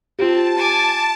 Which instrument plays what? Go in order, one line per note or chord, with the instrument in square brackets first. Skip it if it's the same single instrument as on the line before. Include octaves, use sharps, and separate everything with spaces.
[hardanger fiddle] C4 [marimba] F4 G4 [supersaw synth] A5
[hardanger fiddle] G#5 D6